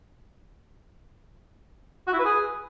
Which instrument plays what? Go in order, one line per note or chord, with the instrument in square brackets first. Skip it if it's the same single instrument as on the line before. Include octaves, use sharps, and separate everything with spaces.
[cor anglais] F#4
E4
B4
G#4